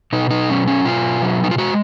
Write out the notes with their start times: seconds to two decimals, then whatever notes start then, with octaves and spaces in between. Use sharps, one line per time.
0.13 B2 D#4
0.30 D#4
0.49 F#3 C#4
0.68 C#4
0.85 B2 F4
1.22 F#3
1.44 D#4
1.51 F4
1.58 G#3 F#4